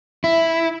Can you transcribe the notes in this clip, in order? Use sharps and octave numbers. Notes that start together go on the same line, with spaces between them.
E4